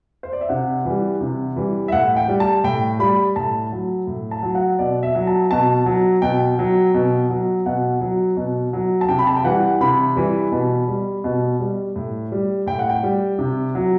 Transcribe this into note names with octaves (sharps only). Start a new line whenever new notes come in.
C5
D5
E5
C3 F#5
E3 G3
C3
E3 G3
E5
A2 F#5
G5
G3
A5
A2 G5
G3 B5
A2 A5
F#3
A2
A5
F#3
F#5
B2 D5
E5
F#3
A5
B2 A5
F#3
B2 G5
F#3
B2
F#3
B2 F#5
F#3
B2
F#3
A5
C3 G5
B5
A5
G5
E3 G3 F#5
C3 B5
E3 G3
B2
G3
B2
G3
A2
G3
A2 G5
F#5
G5
G3
C3
F#3